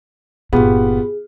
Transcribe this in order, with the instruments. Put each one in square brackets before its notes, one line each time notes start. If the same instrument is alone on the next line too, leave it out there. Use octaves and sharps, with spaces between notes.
[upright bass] G1 A#2 [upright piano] B3 F4 G4 [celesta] G#4